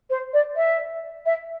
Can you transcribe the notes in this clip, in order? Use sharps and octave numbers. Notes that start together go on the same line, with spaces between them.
C5
D5
E5
E5